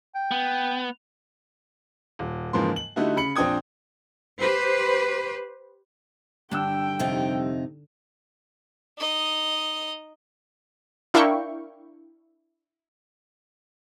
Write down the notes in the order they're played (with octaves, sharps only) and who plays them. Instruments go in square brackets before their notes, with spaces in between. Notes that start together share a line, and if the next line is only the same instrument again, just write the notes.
[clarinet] G5
[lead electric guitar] B3
[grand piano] D#1
G#2 C#3 E3 F3 A#3 C6
F#7
D3 G3 A3 D#4 E4 F#4
C#3 B5 C#7 F#7
A#1 C4 D4 G5 D#6 G#6
[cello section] G4 B4 C5
[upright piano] G2 E6 [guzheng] D3 D4 [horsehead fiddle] G5
[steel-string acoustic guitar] F2 C3 D#4
[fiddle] D#4 D#5
[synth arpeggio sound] D4 E4 A#4 F5 G5 C#6